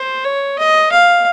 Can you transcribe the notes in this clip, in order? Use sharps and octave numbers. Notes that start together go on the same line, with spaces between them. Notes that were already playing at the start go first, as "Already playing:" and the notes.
Already playing: C5
C#5
D#5
F5